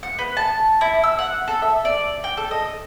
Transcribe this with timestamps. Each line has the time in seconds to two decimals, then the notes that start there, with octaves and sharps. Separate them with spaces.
0.03 F#5
0.19 B3
0.37 A5
0.81 E4
1.04 E6
1.19 F#5
1.48 A4
1.62 E5
1.85 D5
2.24 G5
2.37 A4
2.51 D#5